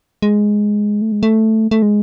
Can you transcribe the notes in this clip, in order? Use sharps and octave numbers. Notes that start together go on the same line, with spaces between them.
G#3
A3
G#3
A3
A3
G#3